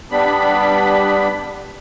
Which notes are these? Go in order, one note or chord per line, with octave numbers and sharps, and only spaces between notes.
G3 B3 D4 B5